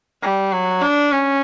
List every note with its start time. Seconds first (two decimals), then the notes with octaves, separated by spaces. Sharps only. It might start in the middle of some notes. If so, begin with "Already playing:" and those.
0.22 G3
0.52 F#3
0.82 D4
1.12 C#4